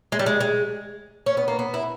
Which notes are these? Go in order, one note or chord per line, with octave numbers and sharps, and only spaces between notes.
G#3
G3
G#3
G#3
C#4
B3
A#3
B3
E4